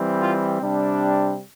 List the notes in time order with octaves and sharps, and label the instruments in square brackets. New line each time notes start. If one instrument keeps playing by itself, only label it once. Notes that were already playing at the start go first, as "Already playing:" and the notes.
Already playing: [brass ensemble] E3 G3 C4
F4
C3 G3 C4 D4